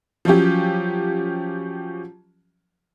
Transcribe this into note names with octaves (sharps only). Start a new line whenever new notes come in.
F3 F#3 C#4 G4